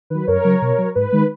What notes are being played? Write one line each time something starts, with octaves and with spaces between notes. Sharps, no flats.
D#3 F#3 B4
F#2 A#4 C#5
C#3 F#3
B2
F#3
G#2 B4
D#3 G#3